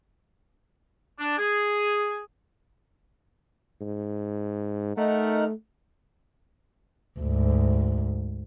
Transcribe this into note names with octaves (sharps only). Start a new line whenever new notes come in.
D4
G#4
G#2
A3 D#4 A#4 F#5
D2 G#2